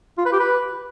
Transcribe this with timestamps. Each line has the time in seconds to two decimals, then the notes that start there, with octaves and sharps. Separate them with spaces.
0.18 F4
0.25 B4
0.32 G4
0.40 B4